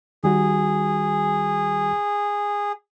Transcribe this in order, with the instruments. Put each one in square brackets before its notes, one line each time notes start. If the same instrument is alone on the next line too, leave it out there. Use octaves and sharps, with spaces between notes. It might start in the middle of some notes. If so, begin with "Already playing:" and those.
[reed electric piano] D#3 G3 F#4 [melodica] G#4